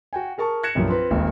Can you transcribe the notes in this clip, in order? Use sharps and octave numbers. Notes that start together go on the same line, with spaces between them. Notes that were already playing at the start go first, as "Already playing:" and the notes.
F#4 G5 G#5
G#4 A#4 A5 C#6
F#6 G#6 A#6 C#7 E7
C2 G2 A#2 F3 F#3 A#3
C4 F4 B4
D#1 G#1 D#2 G#2 A#3